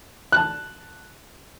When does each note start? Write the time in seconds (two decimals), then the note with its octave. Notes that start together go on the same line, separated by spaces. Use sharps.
0.32 A5 F#6